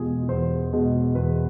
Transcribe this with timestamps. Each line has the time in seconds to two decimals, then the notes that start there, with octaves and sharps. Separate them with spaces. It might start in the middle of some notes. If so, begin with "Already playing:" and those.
Already playing: E2 B2 G#3 F4 G4 G#4
0.28 E2 C5
0.73 B2 G#3
1.15 E2 B4